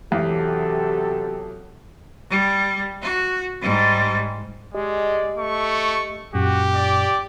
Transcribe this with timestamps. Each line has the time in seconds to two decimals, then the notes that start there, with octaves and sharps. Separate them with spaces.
0.12 E2 C3 F#3 G4 A4
2.30 G3
3.02 F#4
3.61 G#2 G3
4.75 G#3 G4 D5 D#5
5.38 A3 C#6
6.34 F#2 A#2 F#4 G4
6.75 D5